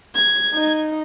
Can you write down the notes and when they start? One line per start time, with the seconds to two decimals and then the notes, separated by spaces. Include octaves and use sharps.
0.15 G#6
0.54 D#4